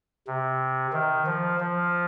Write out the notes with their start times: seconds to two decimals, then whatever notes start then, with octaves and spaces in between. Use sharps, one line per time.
0.27 C3
0.93 D#3
1.26 F3
1.60 F3